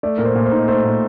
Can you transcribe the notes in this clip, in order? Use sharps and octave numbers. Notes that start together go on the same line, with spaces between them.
A3 D5
A#2 A#4
C5
A#2
C5
D#4
A3 C5
A#2